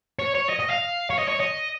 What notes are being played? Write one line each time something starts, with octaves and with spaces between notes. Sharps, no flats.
C#5
C#5
D#5
D#5
F5
C#5
D#5
C#5
D#5